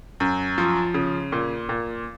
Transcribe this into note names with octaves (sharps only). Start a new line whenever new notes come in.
F#2
F3
C#3
A#2
A#2